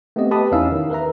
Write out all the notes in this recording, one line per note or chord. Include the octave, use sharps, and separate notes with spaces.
A3 B3 C4 G4 D#5
G4 B4 A5 B5 D#6
E2 C#4 D#4 E4 F5 E6
D#3
A#4 B4 E5 A#5